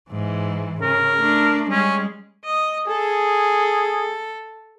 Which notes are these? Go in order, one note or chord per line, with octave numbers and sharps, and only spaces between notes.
G#2 E3
C#3 A#4
A3 D4
G3 G#3 C#4
D#5
G#4 A4